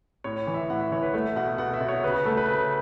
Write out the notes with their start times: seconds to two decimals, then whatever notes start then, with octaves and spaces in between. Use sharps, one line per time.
0.24 A2 C#5
0.47 E3
0.54 E5
0.70 A2 F#5
0.80 E5
0.92 E3 C#5
1.03 B4
1.14 A3 E5
1.36 B2 F#5
1.58 B2 F#5
1.74 E5
1.81 B2
1.88 C#5
2.03 C#3 B4
2.14 F#4
2.26 A3 A4
2.37 B4
2.48 C#3 B4